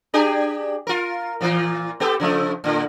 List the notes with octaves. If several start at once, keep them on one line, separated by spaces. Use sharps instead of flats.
D4 G4 G#4
F4 A#4
A#2 E3 F4
B3 G4 A4
C#3 F3 A3
A2 D3